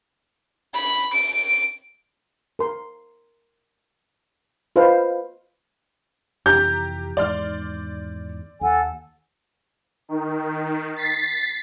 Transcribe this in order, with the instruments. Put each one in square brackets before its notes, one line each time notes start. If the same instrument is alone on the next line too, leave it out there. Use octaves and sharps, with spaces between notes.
[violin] B5
D7
[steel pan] A#4 C6
F4 B4 C5 D#5 F5
[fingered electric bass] F2 C3 E3 [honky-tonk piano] G4 A#5 [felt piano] G6
[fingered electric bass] E2 G#2 D#3 [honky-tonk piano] D5 C6 F6
[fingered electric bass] D#2 [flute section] A4 F#5 G#5
[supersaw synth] D#3
A6 B6 C7